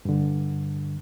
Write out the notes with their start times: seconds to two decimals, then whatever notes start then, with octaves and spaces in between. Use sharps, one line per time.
0.05 G2 D3